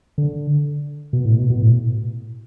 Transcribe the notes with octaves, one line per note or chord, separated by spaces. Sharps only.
D3
B2
A2
B2
B2
A2